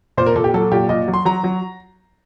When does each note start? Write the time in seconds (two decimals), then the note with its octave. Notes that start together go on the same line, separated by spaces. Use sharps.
0.17 A#2 C5
0.26 A#4
0.36 A#2 A4
0.44 G4
0.54 F#3 A4
0.72 A#2 G4
0.89 A#2 D#5
1.08 F#3
1.14 C6
1.25 F#3 A#5
1.44 F#3